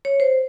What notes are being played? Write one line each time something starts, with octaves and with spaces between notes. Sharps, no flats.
C#5
C5